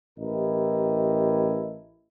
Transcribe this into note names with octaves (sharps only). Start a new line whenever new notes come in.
A1 E4 G4 A4 A#4 D#5